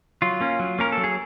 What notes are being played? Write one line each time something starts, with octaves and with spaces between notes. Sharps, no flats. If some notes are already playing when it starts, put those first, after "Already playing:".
F#3 F4
A#3 C#4
F#3
A#3 C#4 A#4
A4
F#3
G#4